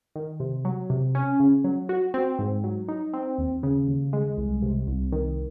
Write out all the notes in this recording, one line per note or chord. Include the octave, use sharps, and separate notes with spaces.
D#3
C3
F#3
C3
C#4
C#3
F#3
F#4
C4
G#2
F#3
D#4
C4
D#2
C#3
D#2
G#3
C2
C3
C2
D#3